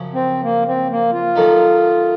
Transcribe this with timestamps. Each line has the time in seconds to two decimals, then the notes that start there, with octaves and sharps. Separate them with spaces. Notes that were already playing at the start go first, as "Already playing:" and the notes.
Already playing: F#2 C#3 F3
0.14 C4
0.43 A#3
0.67 C4
0.90 A#3
1.12 F4
1.36 F#2 D#3 A3 D#4